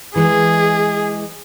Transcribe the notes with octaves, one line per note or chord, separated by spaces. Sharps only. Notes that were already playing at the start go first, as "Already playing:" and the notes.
E3 G#3 G#4